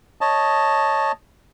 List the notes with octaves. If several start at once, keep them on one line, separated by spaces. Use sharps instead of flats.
C#5 D#5 A5